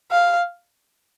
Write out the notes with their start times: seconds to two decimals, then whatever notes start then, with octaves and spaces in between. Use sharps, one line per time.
0.12 F5